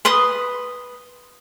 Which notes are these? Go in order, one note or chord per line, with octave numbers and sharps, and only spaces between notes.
B4 C6 D#6